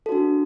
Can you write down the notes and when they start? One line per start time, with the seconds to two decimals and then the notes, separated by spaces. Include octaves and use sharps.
0.06 A4
0.09 F#4
0.12 D4